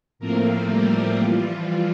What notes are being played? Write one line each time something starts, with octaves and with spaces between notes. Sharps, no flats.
A2 F3 A3 A#3 C4 A#4
G3 G4
E3 F3 G3 F4